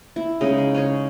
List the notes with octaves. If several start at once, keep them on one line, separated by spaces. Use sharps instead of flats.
E4
C#3 G#3 D#4
G#4
C#4 G#4 C#5